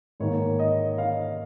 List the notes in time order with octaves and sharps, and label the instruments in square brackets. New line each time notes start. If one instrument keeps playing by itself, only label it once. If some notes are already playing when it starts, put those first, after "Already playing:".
[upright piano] G#2 D#3 A#3 C#5
D#5
F5